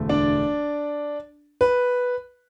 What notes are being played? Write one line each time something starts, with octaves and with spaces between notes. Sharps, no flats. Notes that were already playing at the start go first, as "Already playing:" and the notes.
Already playing: E1 D2 D3 A3
D4 D5
B4